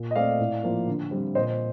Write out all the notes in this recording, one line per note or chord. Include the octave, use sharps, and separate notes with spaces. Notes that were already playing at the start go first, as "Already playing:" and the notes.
Already playing: A#2
D#5
A3 C4 D5 F5
A2
F3 A#3
D3
G3 C4
A#2 C5 D#5